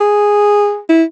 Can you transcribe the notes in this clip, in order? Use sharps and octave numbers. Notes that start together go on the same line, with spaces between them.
G#4
E4